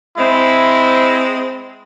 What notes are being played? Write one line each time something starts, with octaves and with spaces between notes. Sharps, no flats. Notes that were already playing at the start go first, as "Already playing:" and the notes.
G#3 C4 E4